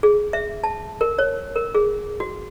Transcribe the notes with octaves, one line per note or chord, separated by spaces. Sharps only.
G#4
E5
A5
A#4
C#5
A#4
G#4
F#4